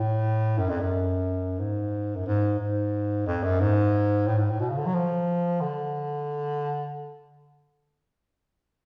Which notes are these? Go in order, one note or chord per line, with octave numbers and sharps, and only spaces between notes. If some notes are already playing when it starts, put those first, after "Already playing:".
Already playing: A2
F#2
F2
F#2
G#2
F#2
G#2
G#2
F2
F#2
G#2
A2
G#2
A2
B2
C#3
D3
F#3
F3
D3